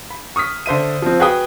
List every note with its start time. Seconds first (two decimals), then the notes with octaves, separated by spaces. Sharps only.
0.10 B5
0.36 C#6 D#6 F6 B6
0.66 D3 C5 E5 D#7
1.02 F3 C4
1.19 F#4 G#4 B4 G5 D#6